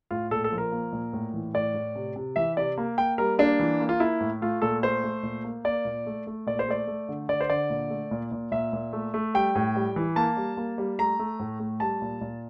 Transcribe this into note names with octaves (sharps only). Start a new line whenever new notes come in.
A2 F4
A#2 A4
A4
F3
A#4
A#3
A#2
A2
E3
A2 D5
A2
C3
C3
E3 E5
C3 D5
A#3
A#3 G5
G3 A#4
A#3 D4
E3
A#3
F4
A#3 E4
A2
A3 F4
A#2 A4
A3 C5
A3
A#2
A#3
A#3 D5
A#2
A3
A3
A#2 D5
C5
A3 D5
A3
D3
D3 D5
C5
D3 D5
A#2
A3
A#2
A#2
A#2 E5
A#2
A3
A3
G3 G5
A2
G3
E3
A#3 A5
G3
A#3
G3
A3 A#5
A3
A2
A3
G3 A5
A#2
A#2